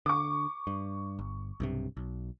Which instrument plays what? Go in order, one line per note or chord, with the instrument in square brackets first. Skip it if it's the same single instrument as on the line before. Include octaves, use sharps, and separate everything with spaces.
[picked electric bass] D3 [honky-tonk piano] C#6 D6
[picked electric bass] G2
G1
B1 G2 C3
B1